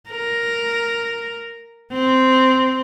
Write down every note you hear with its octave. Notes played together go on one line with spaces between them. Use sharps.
A#4
C4